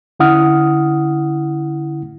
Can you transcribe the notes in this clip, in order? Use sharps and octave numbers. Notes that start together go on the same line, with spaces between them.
D3 C#4 E4 F#5 D#6 F6